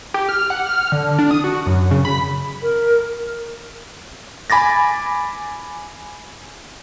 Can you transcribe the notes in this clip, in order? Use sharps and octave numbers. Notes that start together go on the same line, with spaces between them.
G4
F6
F#5
F6
D3
D4
D#6
F#4
F#2
C#3
B5
A#4
G#5 B5 D6 A6 A#6